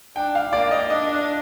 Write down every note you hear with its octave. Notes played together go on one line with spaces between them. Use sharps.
D4 G5
F5
A#3 D5
D#5
D4 D#5